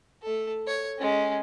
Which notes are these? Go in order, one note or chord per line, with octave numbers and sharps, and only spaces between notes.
A3 A4
C#5
G#3 C#4